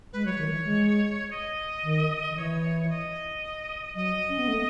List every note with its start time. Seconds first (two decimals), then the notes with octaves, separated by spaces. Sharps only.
0.13 G#3 B4
0.25 F#3 C#5
0.38 D#3
0.51 E3
0.65 G#3
1.31 D#5
1.83 D#3
2.31 D#3
2.36 E3 C#5
2.82 C#5
2.90 D#5
3.95 F#3 D#5
4.29 C#4
4.38 B3
4.48 A3